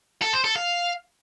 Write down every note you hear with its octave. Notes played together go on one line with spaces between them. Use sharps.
A4
C5
A4
F5